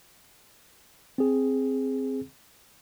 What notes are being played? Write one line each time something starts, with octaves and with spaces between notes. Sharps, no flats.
C4 G#4